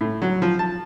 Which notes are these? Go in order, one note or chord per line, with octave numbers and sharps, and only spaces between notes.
A2
F#3
F3
A5